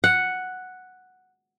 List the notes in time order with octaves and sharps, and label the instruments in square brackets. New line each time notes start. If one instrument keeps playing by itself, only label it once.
[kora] F#5